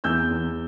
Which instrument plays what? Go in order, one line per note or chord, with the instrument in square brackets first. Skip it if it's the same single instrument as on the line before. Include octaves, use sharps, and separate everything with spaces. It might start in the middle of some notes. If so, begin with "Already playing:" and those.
[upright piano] E2 E6 G6
E2